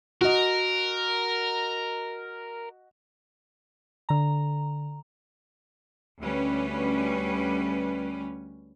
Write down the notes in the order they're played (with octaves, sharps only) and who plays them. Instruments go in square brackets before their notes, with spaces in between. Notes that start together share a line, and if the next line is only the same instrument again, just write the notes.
[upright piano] F#4 D#5 [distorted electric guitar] A#4
[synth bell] D3 A#5
[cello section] D2 G3 C#4 B4